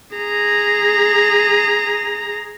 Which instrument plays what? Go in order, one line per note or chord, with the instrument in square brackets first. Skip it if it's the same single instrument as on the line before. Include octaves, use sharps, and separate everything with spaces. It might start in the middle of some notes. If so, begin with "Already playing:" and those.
[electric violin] G#4 A#5